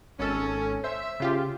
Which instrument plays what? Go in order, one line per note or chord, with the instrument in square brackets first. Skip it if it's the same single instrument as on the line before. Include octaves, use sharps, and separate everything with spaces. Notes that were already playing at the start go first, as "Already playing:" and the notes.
[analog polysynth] G#1 A4 [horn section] C#4
[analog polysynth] C5 [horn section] E5
[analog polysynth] C#3 F4 G4